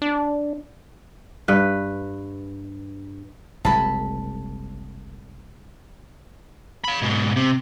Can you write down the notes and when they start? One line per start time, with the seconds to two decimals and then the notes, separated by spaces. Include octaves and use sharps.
0.02 D4
1.48 G2 B4
3.65 F#1 C2 G#3 A5 B5
6.85 F5 B5
7.03 G#2 B2
7.36 C3